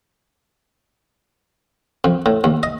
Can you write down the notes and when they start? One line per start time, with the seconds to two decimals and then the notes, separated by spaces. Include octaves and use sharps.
2.04 F2
2.26 A2
2.44 D#2
2.63 D#5